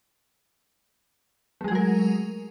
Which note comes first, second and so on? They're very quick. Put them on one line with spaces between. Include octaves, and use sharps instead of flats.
A3 G#3 G#4 F#3 A#4